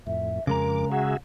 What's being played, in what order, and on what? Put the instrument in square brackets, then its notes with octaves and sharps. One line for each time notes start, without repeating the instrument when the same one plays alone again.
[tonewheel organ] F2 A2 [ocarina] E5
[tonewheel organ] F2 D6 [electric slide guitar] C#3 G#3 A#5 [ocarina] A#4
[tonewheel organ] F#4 G#4 E5 [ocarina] F#5